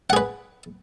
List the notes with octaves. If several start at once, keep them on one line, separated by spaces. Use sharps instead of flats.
G#4 B4 F#5